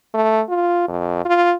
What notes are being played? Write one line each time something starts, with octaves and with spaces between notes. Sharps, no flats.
A3
F4
F2
F4